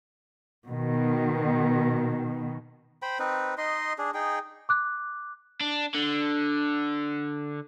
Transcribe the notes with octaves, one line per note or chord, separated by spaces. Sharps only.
B2 D#3
C5 G5 B5
C4 D#4 B4
D#4 D#5 C6
D4 G#4
D#4 G#4 G5
D6 F#6
D4
D3